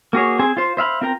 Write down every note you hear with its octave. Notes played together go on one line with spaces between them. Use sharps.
A#3 F#4 G#4 C#5
C4 G#4 C5 G#5
F4 C5
C5 E5 F5 B5
C4 F4 A#4 G5 A#5